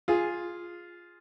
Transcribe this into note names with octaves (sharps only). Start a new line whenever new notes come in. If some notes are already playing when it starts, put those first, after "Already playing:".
F4 G#4